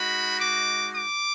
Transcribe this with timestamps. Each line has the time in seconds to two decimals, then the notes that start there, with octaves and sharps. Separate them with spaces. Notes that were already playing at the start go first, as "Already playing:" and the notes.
Already playing: G#3 D#4 F#4 B5
0.40 D6
0.95 D6